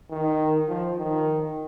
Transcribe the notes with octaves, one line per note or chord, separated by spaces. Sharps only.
D#3
F3
D#3